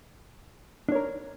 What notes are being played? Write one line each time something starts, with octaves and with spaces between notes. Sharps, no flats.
D4 A#4 C#5